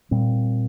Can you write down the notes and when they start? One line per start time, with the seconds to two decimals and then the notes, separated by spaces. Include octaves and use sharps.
0.11 A#2 G3 C4